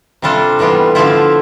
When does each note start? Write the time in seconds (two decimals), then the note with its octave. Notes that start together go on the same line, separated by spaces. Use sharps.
0.22 C3 G3 D4 F4 A4
0.59 A2 E3 G3 B3 F4
0.95 D3 F3 A3 E4 F4